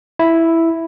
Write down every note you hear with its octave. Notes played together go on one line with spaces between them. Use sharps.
E4